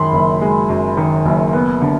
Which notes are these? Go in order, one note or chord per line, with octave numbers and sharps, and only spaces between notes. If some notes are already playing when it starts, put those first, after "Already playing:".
Already playing: F#2 D#3 G#3 B5 C6
F#1
G#3
F#2
D#3
F#1
B3
D3